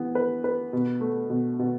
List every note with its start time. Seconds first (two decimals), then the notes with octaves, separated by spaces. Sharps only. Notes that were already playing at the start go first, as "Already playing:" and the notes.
Already playing: E3 B3
0.15 B4
0.44 B4
0.73 B2
1.01 A3
1.30 B2
1.59 B2